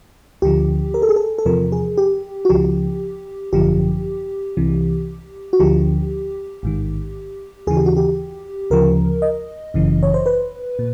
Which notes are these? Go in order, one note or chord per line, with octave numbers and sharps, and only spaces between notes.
D2 D3 F3 G4
A#4
A4
G#4
A4
A4
E2 C3 F3 A#4
G#4
G4
F#4
C#2 C#3 F3 G4
G#1 F#2 D3 F3 G4
C2 C3 E3
F#4
D2 D3 F3 G4
A1 G#2 D#3
D#2 C#3 E3 G#4
G4
F#4
G4
D2 C#3 F3 A#4
D#5
G1 F#2 C#3 E3
C#5
C5
B4
A#2